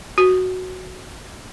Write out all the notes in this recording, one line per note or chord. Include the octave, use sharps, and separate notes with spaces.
F#4